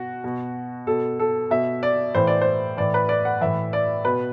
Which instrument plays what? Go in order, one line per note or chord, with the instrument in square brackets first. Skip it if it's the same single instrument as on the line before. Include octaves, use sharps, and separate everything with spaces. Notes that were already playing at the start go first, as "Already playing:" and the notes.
Already playing: [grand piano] B2 F#4
B2
B2 A4
A4
B2 E5
D5
A2 E3 C5
D5
C5
A2 E3 D5
B4
D5
F#5
A2 E3 E5
D5
B2 B4